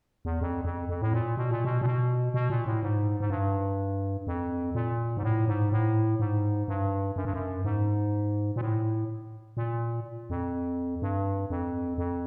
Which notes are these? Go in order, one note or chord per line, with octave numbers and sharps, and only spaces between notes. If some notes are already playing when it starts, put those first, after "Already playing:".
E2
F2
F2
F2
A2
A#2
B2
A#2
B2
A#2
B2
B2
A#2
A2
G#2
G#2
G2
F2
A#2
G#2
A2
G#2
A2
G#2
G2
F#2
G2
F#2
G#2
A#2
A2
A#2
F2
G2
F2
F2